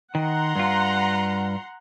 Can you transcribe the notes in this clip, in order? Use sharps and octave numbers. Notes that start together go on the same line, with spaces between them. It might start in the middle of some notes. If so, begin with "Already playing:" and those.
D#3 F#5 A#5 C6
G2 F4